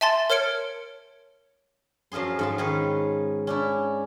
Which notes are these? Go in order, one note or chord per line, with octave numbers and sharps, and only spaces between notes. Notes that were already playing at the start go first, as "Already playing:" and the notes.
E5 G#5 A5 C6 A6
A#4 C#5 F6 G#6 C#7 D7
F#2 F3 F4 G#4 C6
G#2 F4 A5
D#3 C#4 G#4 B4
C#4 D4 E4